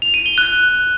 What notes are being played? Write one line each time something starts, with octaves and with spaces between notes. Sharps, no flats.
F7
D#7
G7
F#6